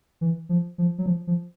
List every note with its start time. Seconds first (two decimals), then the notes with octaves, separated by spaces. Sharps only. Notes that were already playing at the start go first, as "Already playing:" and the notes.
0.21 E3
0.49 F3
0.78 F3
0.98 F#3
1.06 F3
1.27 F3